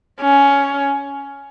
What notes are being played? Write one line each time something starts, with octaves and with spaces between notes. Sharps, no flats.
C#4